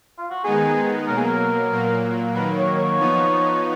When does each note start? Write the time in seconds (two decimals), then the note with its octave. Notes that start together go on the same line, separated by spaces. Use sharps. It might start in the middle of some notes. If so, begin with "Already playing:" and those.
0.18 F4
0.30 F#4
0.44 D#3 G#3 B3 D#4 G#4
1.07 B2 F#3 A#3 A#4
1.17 G#4
1.26 A#4
1.71 A#2 F#3 A#3
2.34 D#3 F#3 A#3 B4
2.56 C#5
2.77 C#5
2.99 F3 B3 D#4